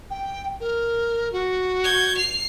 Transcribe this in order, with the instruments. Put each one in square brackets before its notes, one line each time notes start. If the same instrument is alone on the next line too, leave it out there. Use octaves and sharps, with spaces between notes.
[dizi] G5
A#4
F#4
[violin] G6 G#6
C7 F7